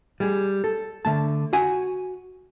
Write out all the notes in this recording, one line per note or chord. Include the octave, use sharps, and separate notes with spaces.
G3 G#4
A4
D3 A3 A5
F#4 F#5 G#5